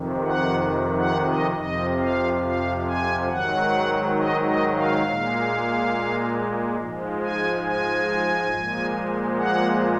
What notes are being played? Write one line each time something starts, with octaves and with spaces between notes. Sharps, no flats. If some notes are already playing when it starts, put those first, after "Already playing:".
Already playing: F2 C3 D#3
F#5
F#5
D#5
F2 C3 F3 D#5
F5
F5
G#5
G#2 D#3 F#3 F#5
D#5
D#5
F5
A#2 G#3
G#2 F3 G#3
G#5
G#5
A#2 F3 G#3
F#5